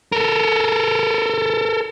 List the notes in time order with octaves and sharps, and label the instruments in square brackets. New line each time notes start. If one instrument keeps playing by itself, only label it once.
[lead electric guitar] A4 A#4